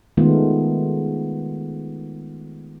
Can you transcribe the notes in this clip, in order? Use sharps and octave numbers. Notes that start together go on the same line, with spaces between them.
D#3 G#3 A3 B3 F4